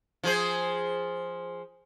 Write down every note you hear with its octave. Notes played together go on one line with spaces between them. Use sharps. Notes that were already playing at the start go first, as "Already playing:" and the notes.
F3 G#4 C5